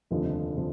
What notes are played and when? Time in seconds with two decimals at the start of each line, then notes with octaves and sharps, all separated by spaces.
0.11 F1 D#2 D3 F3
0.58 D3 F3